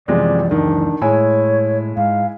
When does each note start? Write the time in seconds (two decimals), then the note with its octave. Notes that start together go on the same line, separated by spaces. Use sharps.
0.08 F#2 C3 E3 F3 G#3 D5
0.51 C#2 F#2 D#3 E3 D4
1.01 A2 G#3 E4 C#5 G#5
1.97 G#2 F5